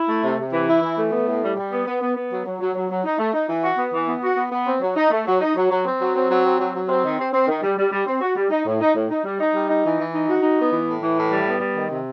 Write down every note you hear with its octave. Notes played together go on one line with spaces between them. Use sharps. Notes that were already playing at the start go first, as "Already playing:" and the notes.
Already playing: E4
A3
C3
C3
E3
E4
E3
A3
B3
A2
G3
G3
B3
B3
B3
B3
F#3
F#3
F#3
F#3
F#3
D#4
A3
D#4
E3
F#4
B3
E3
B3
F#4
B3
B3
C4
F#3
D#4
A3
F#3
D#4
F#3
F#3
C4
F#3
C4
F#3
C4
F#3
F#3
C4
D#3
C4
C4
D#3
G3
G3
G3
C4
F#4
G3
D#4
A2
D#4
A2
D#4
G3
D#4
G3
D#4
E3
E3
D#4
F#4
D#4
B3
E3
A2
E3
A2
G3
B3
G3
D#3
C3